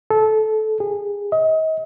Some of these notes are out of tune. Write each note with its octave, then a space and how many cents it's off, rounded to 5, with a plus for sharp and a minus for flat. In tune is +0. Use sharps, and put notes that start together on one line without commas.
A4 -20
G#4 -30
D#5 +35